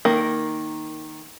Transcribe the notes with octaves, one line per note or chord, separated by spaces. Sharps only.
D#3 A#3 A#4